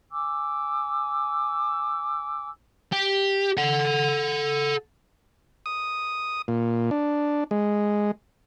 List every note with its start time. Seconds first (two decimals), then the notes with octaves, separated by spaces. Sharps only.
0.12 G#5 D6 E6
2.92 G4
3.58 A4 F#5
5.66 D#6
6.48 A#2
6.91 D4
7.51 G#3